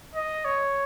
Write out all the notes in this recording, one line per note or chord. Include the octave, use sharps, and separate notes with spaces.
D#5
C#5